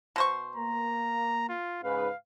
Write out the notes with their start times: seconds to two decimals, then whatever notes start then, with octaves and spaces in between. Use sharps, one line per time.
0.16 B2 C5 C#6
0.56 A#3 A#5
1.49 F4
1.84 G#2 C#3 B4 F5